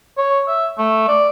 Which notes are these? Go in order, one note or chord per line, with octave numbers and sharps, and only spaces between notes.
C#5
E5
A3
D5